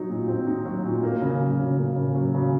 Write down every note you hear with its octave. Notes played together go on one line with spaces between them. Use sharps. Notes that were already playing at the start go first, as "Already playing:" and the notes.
Already playing: F#3 D#4
A#2
C4
D#4
F#3
A#2
A#3
C#3
F#3
C#3
A#3
C#3
F#3
C#3